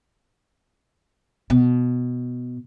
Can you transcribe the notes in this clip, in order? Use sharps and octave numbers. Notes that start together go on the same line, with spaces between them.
B2